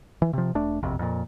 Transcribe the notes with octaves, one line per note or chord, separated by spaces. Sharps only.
E3
C3 F3
E1 A3 D4
E1 A#1 F2 C3
F2 A#2